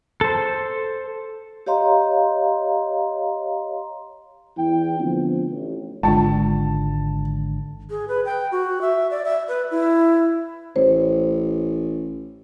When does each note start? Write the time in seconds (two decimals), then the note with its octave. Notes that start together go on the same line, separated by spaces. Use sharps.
0.21 A4 C5
1.66 G4 C#5 D#5 F5 A#5 C6
4.58 E2 E3 E4 G5
5.00 D3 F3 A3 B3 C4 D4
5.51 A1
6.03 G#1 D3 G#3 F4 A5
7.90 G#4
8.08 B4
8.25 G5
8.52 F#4
8.81 E5
9.11 D5
9.25 E5
9.48 B4
9.71 E4
10.76 A1 C5 C#5